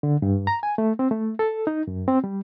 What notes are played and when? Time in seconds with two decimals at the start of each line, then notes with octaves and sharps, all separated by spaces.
0.03 D3
0.22 G2
0.47 A#5
0.63 G#5
0.78 A3
0.99 C4
1.11 A3
1.39 A4
1.67 D#4
1.87 F#2
2.08 C4
2.24 G3